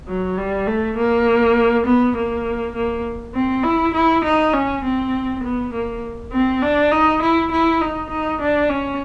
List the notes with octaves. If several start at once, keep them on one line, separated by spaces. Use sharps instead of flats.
F#3
G3
A3
A#3
B3
A#3
A#3
C4
E4
E4
D#4
C#4
C4
B3
A#3
C4
D4
D#4
E4
E4
D#4
D#4
D4
C#4